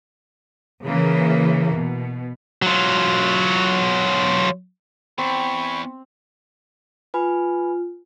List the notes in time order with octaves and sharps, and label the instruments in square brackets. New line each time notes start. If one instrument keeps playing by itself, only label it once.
[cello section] C#3 E3 A#3
B2
[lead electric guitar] F#3 F4
[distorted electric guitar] E2 [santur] C4 [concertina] B5 C#6
[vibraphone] F4 [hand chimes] B4 G#5 B5